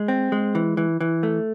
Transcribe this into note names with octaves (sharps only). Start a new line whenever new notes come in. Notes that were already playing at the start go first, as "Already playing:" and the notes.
Already playing: G#3
C4
G#3
E3
E3
E3
A3